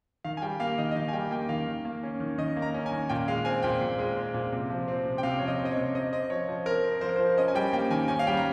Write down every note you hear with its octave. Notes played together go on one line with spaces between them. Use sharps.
D#3 F5
G#5
G3 G5
A#3 F5
D#3 D#5
D#5
D#3 F5
G#5
G3 G5
A#3 G5
D#3 F5
D#3
A#3
C#4
D#3
D#3 D#5
A#3
A#5
C#4
G#5
D#3
A#2 G5
G#3 F5
C4 G#5
A#2 G5
A#2
G#3
C4
A#2
C3
F3
C4
C3
G5
C3 F5
F3 C#5
D#5
C4
D#5
C#5
C3
C4 D#5
C4 D#5
F3 C#5
F3
C4 A#4
C4
F3 C5
A#4
C5
F3
C#4 D#5
G#5
G3 G5
A#3 G5
D#3 G#5
C#4 G#5
F5
G3 G5
A#5